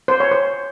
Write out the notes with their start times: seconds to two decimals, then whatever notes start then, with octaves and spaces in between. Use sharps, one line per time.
0.08 C5
0.20 C#5
0.31 C5